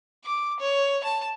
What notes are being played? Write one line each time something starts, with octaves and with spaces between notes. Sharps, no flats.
D6
C#5
A5